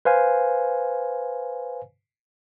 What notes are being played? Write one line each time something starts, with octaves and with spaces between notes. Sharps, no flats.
B4 C5 F5 G#5